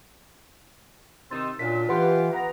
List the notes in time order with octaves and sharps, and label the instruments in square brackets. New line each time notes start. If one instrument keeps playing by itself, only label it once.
[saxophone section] C3 D#3 D#4 [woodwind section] C6 E6 [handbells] A6
[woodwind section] F#2 A#2 [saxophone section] D4 F4 [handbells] B6
[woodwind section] E3 [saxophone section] F4 G4 [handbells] B4 F#5 C6
[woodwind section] B3 A#5